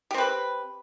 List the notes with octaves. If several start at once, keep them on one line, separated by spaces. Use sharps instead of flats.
C4 G4 B4